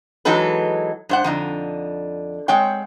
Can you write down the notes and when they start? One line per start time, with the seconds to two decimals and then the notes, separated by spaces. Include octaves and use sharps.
0.25 E3 F#3 G#3 D#4 A4 B4
1.09 G2 C5 F#5
1.24 F2 D3 D#4
2.48 G#3 C4 C#5 F#5 G5